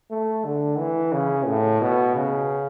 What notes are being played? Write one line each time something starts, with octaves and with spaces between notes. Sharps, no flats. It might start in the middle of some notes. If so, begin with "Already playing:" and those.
A3
D3
E3
C#3
A2
B2
C#3